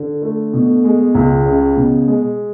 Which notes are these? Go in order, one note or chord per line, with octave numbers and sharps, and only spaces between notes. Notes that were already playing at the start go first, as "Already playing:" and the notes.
Already playing: D3
A3
B2
G#3
C#2
C#3
B2
G#3